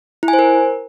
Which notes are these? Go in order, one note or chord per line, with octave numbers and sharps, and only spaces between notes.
E4
G#5
C5
A#4